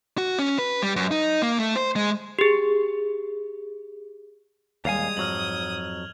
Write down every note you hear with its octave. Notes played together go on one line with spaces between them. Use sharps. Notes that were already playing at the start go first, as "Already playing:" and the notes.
F#4
C#4
B4
G3
F#2
D#4
A#3
A3
C5
G#3
G4 G#4
D#2 G3 G#3 F5 G#5 D#6 G#6 F7
F2 G#2 F#3 F6 F#7